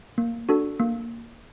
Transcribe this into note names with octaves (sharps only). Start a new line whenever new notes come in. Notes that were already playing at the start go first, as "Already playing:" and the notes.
A#3
D4 F#4 A4
A#3